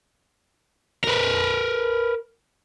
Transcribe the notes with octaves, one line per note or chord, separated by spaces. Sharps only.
A#4 B4